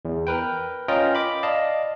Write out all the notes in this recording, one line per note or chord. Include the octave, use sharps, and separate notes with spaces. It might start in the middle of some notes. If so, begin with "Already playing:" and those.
E2
A#4 B4 G5
C#4 F4 A#4 D#5 G5
B5 D6
D5 D#5 F5 A5